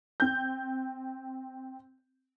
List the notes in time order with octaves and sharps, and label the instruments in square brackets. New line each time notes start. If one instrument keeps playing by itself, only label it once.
[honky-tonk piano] C4 G6